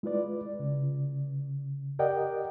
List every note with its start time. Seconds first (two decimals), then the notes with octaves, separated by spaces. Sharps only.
0.03 G#3 E4 F4 B4 D5
0.59 C#3
1.99 G4 A#4 D5 D#5 F#5 G5